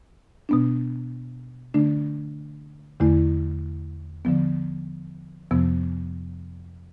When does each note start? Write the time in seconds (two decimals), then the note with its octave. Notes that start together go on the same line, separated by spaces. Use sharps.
0.49 B2 B3 D4
1.74 D3 A3 D4
3.00 E2 D3 A3 E4
4.25 D3 F3 B3
5.51 F2 C3 F3 B3